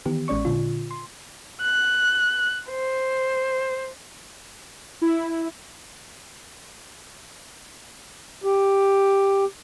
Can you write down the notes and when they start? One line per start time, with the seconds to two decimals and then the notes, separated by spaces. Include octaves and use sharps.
0.06 D#3 E3 B3 G4
0.28 A1 G#3 C#4 D5 C#6
0.45 A#2 D3 F4
0.91 C6
1.62 F#6
2.70 C5
5.02 E4
8.44 G4